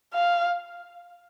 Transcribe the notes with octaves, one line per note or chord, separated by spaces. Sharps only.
F5